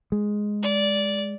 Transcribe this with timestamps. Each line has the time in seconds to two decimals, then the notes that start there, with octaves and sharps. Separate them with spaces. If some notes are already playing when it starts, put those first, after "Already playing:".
0.12 G#3
0.62 D5